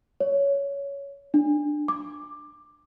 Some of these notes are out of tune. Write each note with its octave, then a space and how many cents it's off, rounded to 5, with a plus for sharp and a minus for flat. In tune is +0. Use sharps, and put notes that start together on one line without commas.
C#5 +15
D4 +15
D6 +15